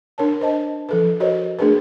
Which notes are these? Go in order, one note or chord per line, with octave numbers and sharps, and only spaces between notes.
D4 A#4 C#5 A5
C5 D#5 A5
F3 A4 B4
F#4 A#4 C5 C#5 D#5
A3 D4 G#4 A#4 B4